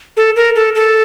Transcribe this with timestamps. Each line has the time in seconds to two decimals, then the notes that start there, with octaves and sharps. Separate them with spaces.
0.17 A4
0.36 A#4
0.56 A4
0.75 A4